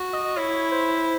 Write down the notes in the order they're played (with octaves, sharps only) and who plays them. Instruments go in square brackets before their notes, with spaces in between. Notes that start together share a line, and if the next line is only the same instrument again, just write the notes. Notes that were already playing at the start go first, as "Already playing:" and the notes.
Already playing: [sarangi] F#4
[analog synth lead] D#5
[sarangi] E4 [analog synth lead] C#5
[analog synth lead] C5